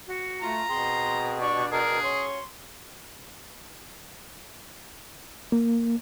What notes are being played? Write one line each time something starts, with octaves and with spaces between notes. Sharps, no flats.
F#4
A3 F4 A#5
B2 C4 G#4 C6
D4 G4 D5 C#6
D4 G#4 A#4
C#4 F#4 C#5 C6
A#3